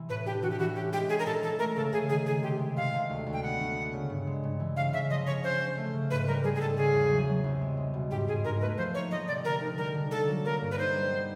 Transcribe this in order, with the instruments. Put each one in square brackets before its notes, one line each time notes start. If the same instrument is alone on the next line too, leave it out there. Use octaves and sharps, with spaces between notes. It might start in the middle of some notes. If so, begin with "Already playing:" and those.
Already playing: [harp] C3 E3
[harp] A2 [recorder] B4
[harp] D4 [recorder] G4
[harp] E3 [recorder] F#4
[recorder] G4
[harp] E3 [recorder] F#4
[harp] C#4 [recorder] G4
[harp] G#3 [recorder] G4
[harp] C#4 [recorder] G#4
[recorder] A#4
[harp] A#2 [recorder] A4
[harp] E3 [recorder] A4
[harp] A3 [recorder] A#4
[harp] C#3 [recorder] A4
[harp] C#3 [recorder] G#4
[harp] D#3 [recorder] G#4
[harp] D#3 [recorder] G#4
[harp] C3 [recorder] G4
[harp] G#3
[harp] C3 [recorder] F5
[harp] C3
D2
D2
[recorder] G5
[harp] B3 [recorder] F#5
[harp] D2
B3
C#3
G2
G#3
G2
E3
[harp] C#3 [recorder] F5
[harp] C#3 [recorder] E5
[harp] F3 [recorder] D#5
[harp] C#3 [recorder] C#5
[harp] C#4 [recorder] C5
[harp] C#4
A3
C#3
[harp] G#2 [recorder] B4
[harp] G3 [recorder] A#4
[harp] G3 [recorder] G#4
[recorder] G#4
[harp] G#2 [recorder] A4
[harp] C#3 [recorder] G#4
[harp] E2
F#3
F#3
C2
G#3
G#3
B2
[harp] G#2 [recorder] G4
[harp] G#2 [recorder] G#4
[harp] G#2 [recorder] A#4
[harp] A3 [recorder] B4
[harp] F3 [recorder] C5
[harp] A#3 [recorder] C#5
[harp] F3 [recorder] D#5
[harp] C3 [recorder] D5
[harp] D3 [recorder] A#4
[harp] D#4
[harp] G3 [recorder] A#4
[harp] D3
[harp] A#3 [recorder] A4
[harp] F#3
[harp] A#3 [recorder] A#4
[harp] G2
[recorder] B4
[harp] D#4 [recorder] C5
[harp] G3
B3